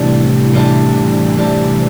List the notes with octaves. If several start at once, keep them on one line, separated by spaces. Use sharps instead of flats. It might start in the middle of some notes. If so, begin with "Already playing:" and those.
Already playing: A2 C3 E3 G3 D4
A2 G3 D4
A2 G3 D4